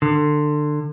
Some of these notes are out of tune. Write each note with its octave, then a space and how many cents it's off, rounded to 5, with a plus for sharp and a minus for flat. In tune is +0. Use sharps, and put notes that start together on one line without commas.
D3 +25